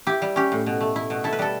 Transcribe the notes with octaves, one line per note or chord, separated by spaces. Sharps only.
E4 G4
G3
C#4 G4
A2
B2
A3
E4
B2
E4 A4
B4
G3 A4